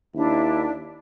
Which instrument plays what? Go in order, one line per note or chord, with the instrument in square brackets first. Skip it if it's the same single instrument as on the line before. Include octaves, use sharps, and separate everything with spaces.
[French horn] D#2 [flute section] D4 E4 E5